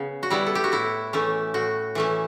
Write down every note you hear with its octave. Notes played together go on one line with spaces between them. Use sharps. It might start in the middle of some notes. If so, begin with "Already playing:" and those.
Already playing: C#3 B3
F#4
G3 B3 E4
A4
G4
F#4
A2 E4
E3 A3 C#4
A2 F#4
E3 A3 C#4